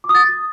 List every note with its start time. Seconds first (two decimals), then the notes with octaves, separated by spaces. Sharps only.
0.04 D6
0.09 D#6
0.15 A6